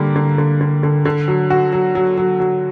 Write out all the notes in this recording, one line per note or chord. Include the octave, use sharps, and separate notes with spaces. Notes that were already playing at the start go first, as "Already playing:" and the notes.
Already playing: D3 G3 A#3
D3
D3
D3
D3
D3
F#3
F#4
F#3
F#3
F#3
F#3